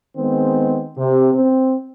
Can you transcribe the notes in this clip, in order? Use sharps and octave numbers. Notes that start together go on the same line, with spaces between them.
D#3 G#3 B3 C4
C3
C4